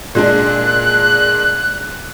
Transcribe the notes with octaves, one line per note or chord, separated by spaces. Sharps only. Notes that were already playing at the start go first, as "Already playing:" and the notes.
A#2 G#3 D4 F#6